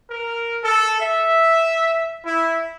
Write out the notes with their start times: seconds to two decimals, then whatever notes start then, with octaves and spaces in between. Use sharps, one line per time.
0.10 A#4
0.63 A4
1.00 E5
2.25 E4